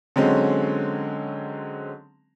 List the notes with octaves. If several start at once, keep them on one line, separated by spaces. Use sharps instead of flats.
D3 F#3 G#3 C4 C#4